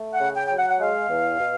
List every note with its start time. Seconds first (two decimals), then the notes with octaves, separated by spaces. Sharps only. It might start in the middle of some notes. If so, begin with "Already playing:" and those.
Already playing: A3
0.13 F#5
0.20 C#3
0.35 G5
0.47 F#3 G5
0.58 F#5
0.70 F#5
0.80 G#3 F5
1.09 E2
1.39 B2